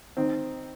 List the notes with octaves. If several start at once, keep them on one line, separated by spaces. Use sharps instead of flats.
D#3 C4